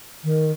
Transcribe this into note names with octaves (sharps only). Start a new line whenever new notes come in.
D#3